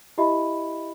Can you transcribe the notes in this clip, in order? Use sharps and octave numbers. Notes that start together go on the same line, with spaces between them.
E4 G4 D#5 E5 B5